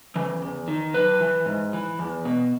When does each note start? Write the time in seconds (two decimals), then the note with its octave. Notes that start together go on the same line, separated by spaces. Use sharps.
0.16 C#3 E3
0.42 E2
0.68 D#3
0.94 F#2 B4
1.20 E3
1.46 G#2
1.73 E3
1.99 E2
2.25 B2